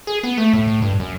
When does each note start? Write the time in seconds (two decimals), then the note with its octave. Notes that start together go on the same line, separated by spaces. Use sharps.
0.07 G#4
0.23 B3
0.38 A3
0.53 A2
0.68 A2
0.82 G2
1.00 F#2